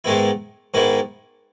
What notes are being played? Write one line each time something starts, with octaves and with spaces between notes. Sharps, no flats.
G#2 D#3 G#3 B3 E4
G#2 D#3 G#3 B3 E4